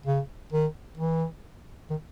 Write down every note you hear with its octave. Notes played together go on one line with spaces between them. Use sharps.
C#3
D#3
E3
D#3